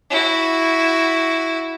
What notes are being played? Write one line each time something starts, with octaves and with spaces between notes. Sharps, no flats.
E4 F#4